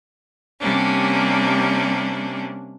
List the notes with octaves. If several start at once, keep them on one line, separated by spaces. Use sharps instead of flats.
C3 G3 A#3 C#4 D4